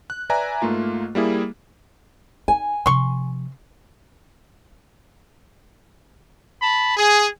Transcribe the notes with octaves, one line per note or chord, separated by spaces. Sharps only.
F#6
B4 D5 E5 G#5 A#5
G#2 A3 A#3 F4
G3 A#3 E4 G#4
D#4 G#5
C3 F3 C6 C#6
A5 B5
G#4